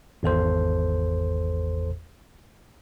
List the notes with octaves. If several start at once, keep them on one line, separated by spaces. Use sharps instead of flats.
G#1 E2 A4 C5